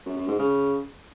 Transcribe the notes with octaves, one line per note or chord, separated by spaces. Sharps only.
F#2
F#2
G#2
C#3